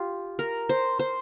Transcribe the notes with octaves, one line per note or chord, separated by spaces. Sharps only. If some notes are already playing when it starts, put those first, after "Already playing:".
Already playing: F4 G4
A#4
C5
C5